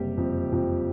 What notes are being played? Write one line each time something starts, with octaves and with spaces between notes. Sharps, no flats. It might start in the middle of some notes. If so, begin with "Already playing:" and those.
Already playing: F#1 C3 G3 G4
F2
F2